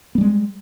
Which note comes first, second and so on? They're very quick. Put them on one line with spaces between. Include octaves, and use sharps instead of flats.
B3 G3 G#3